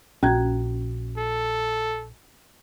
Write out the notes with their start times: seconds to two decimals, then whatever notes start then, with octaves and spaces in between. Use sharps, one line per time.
0.23 A#1 C#4 F#4 A#5 G#6
1.18 A4